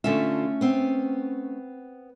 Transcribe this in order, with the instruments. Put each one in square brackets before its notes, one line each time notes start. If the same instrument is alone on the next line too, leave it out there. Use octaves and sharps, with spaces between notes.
[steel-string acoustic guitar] D3 F4 [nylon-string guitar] A3 C#4 E5
[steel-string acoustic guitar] B3 C4